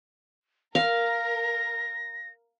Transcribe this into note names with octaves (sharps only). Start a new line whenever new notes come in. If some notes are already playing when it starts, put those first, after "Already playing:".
A#4 F5 A#6